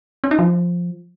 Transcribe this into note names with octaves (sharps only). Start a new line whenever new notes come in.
C#4
D#4
F3